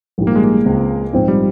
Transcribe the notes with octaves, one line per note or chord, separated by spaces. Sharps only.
A#1 G#2 G3
A#3
G#3
A#3
C#2 C#3 G#3 C4
A#1 G#2 F3 C4
G3